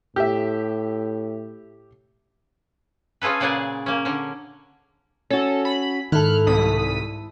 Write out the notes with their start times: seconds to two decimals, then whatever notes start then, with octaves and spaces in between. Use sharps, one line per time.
0.16 A2 G4 E5
3.21 C#4 F4 G#4 A4 B4
3.40 A#2 C#3 F#3 D5 F#5 G#5
3.86 A#3 C#4
4.05 D3 C#4
5.30 C#4 F#4 A4
5.65 B5
6.12 G#2 D#3 E4 A4 F6 F#6
6.47 C2 D#6 B6